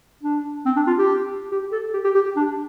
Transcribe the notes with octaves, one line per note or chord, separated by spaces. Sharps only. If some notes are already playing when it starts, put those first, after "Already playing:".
D4
C4
D4
F4
G4
G4
A4
G4
G4
G4
G4
D4